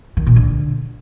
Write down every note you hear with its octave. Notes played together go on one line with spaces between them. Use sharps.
D#3
A#2
D3